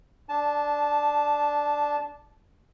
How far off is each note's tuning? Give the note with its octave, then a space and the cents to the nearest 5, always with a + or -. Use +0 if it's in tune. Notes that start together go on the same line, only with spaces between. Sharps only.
D4 +0 A5 -15